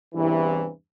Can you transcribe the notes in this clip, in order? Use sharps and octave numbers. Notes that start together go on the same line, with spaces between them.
E2 G2 C3 E3